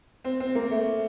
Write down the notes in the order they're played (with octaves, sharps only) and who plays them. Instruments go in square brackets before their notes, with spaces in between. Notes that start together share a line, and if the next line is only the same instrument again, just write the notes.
[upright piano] C4
C4
A#3
A3